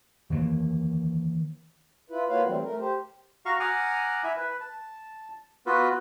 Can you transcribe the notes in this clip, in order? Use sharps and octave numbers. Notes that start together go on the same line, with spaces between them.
D#3 E3 A3 A#3
E4 F4 B4
A#3 F4 F#4 B4 C#5 F5
E3 F#3 G3 A3 C4
A3 A#4
G4 C5
F#4 F5 A#5 C#6
F#5 G#5 A#5 D6 D#6 F6
E4 E5 G#5
B4
A5
B3 F4 F#4 B4